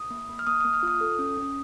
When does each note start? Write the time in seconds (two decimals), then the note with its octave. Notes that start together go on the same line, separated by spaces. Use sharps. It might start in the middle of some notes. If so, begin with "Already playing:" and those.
Already playing: D#6
0.10 A#3
0.29 A#3
0.39 F6
0.47 A#3 D#6
0.61 A#3 D#6
0.74 F6
0.83 F4 D#6
1.01 A4
1.19 C#4
1.37 C#4